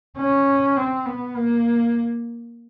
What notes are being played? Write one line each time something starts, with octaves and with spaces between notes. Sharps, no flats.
C#4
C4
B3
A#3